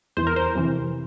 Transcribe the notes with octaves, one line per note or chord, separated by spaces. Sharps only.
E2 E3 C5
A#4
C5
F2 C3 E3